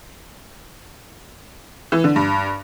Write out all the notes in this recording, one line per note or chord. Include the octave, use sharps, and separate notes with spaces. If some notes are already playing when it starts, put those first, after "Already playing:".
E3
D3
G2